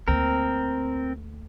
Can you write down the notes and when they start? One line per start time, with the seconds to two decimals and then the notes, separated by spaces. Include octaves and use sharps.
0.08 D2 A#3 C4 A#4